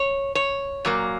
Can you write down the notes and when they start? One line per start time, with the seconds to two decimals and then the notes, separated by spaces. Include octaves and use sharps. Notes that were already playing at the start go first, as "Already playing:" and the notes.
Already playing: C#5
0.35 C#5
0.85 A#2 F#3 A#3